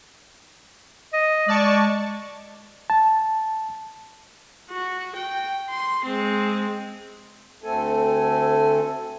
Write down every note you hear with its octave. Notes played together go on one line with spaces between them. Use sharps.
D#5
G#3 D5 A5 C#6
A5
F#4
G5
C6
G#3 C4
D2 A3 C4 A4 G#5